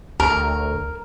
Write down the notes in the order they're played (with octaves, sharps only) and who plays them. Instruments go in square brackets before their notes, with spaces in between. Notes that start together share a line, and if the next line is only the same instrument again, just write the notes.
[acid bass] D2 [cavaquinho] A#4